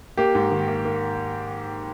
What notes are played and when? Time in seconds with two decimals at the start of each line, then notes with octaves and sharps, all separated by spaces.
0.17 A#3 G4
0.35 G#2
0.51 D#3
0.68 A#3
0.85 A#3